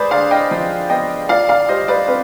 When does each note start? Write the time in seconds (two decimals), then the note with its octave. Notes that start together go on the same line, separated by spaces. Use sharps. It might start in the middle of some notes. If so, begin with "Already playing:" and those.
Already playing: G#3 G#4 B4 C5 D5
0.11 D3 D5 F5
0.31 D#5 G5
0.51 F3
0.90 B3 D#5 G5
1.29 F4 D5 F5
1.49 D5 F5
1.68 G3 C5 D#5
1.88 B4 D5
2.08 C4 B4